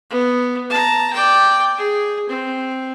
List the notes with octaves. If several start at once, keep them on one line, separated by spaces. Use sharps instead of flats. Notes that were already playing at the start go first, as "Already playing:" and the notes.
B3
A5 A#5
D5 G5
G#4
C4